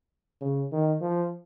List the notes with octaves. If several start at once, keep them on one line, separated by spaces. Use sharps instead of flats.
C#3
D#3
F3